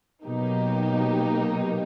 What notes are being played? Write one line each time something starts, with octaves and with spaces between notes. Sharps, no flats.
B2 F#3 A#3 D#4 G4